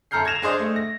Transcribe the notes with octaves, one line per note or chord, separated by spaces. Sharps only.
F#2 A4 A#5 F6 G6 C7
G#6 A#6 E7 F7
D4 G#4 C5 D#5
A3
A#6